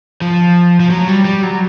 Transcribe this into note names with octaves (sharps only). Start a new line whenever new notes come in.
F3
F3
F#3
G3
G3
F#3